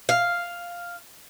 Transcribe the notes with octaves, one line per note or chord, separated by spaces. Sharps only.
F5